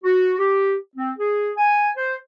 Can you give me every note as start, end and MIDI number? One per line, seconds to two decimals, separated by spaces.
0.04 0.35 66
0.39 0.75 67
0.96 1.12 60
1.19 1.51 68
1.57 1.89 80
1.97 2.14 72